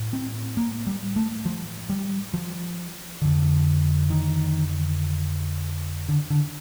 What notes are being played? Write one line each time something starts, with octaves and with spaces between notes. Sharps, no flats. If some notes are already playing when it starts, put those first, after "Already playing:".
Already playing: A2
C4
A#3
G3
A3
F3
G3
F3
F2 D3
D#3
D3
D3